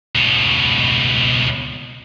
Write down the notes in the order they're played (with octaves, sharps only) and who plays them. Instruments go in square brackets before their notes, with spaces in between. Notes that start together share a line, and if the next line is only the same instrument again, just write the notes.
[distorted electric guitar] C#2 B2